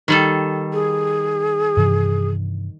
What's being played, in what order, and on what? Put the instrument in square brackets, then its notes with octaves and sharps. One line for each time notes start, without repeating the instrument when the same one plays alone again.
[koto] D#3 G3 A4
[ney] G#4
[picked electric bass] G2 C3 E3